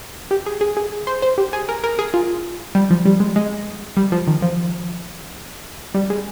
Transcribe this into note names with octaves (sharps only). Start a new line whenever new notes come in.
G4
G#4
G#4
G#4
C5
C5
G4
G#4
A#4
A#4
G#4
F4
G3
F3
G3
G#3
G#3
G3
F3
D#3
F3
G3
G#3